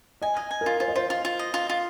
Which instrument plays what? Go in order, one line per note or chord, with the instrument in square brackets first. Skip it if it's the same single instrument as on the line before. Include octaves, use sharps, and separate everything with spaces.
[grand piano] D#5 [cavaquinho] G#5
[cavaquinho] D#5
G#5
[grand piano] A#4
[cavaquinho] F4
[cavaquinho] F4 [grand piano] C5
[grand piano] D#5
[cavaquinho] F4 [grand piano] C5
[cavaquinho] F4
F4
D#5
F4
F4